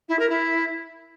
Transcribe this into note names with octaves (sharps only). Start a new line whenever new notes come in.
E4
A#4
E4